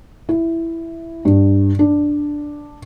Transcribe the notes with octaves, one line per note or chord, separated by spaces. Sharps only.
E4
G2
D4